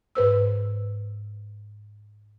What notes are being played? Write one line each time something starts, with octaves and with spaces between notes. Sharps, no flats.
G#2 B4 C5 E6